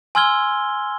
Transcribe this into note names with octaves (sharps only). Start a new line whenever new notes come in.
G#5 C6 E6 F6 G#6 G7